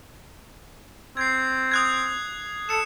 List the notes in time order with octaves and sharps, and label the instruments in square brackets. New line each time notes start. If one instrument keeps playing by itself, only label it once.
[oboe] C4 [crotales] G#6 C7
[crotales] D#6 F#6 G#6
[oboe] A4 [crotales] C#7 E7